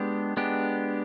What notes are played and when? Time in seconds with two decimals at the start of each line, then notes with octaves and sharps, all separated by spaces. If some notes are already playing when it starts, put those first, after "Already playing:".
Already playing: G#3 B3 D4 G4
0.37 G#3 B3 D4 G4